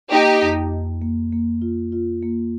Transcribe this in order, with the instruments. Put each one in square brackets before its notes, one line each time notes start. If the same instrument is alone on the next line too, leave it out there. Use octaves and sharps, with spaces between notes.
[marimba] A#3 [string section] D#4 G4
[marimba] F2
F2
A#3
A#3
F4
F4
A#3